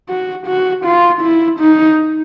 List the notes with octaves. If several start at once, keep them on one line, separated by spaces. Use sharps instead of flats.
F#4
F#4
F4
E4
D#4